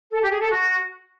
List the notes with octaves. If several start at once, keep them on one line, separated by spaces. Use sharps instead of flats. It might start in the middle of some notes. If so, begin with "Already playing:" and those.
A4
G4
G#4
A4
F#4